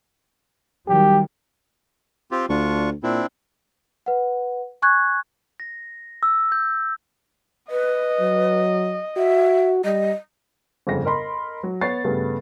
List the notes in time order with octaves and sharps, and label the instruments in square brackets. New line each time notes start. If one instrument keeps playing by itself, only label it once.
[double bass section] D#3 F#3 G3 [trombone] G4
[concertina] C4 F4 G4
[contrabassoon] D2 [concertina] D4 F4 C#6
[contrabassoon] A#2 [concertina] C4 D4 E4
[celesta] B4 F#5
G#5 C#6 F#6 G#6
[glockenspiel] A#6
E6
G6
[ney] B4 [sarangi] D#5
[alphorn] F#3
[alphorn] F#4 [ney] E5
[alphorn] G3 [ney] D#5
[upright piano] G1 F2 C#3 A#6
A#4 D#5 B5 C6
F#3
B3 C#5 A6 C7
G2 C#3 A3 B3